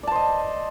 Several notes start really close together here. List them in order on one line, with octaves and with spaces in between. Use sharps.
D5 A5 C5 D#5